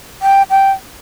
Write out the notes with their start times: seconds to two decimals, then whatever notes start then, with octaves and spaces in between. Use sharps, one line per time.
0.22 G5
0.50 G5